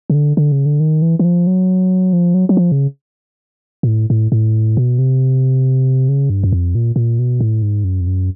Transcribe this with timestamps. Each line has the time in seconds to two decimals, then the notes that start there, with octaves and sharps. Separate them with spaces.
0.10 C#3
0.14 D3
0.37 D3
0.52 C#3
0.66 D3
0.80 D#3
1.02 E3
1.19 E3
1.24 F3
1.47 F#3
2.13 F3
2.34 F#3
2.49 F#3
2.57 F3
2.72 C#3
3.83 A#2
3.88 A2
4.10 A2
4.32 A2
4.77 B2
4.99 C3
6.09 C#3
6.30 G2
6.44 F#2
6.53 F2
6.75 A#2
6.96 A#2
7.19 B2
7.41 A2
7.62 G#2
7.84 F#2
8.01 F2
8.07 F#2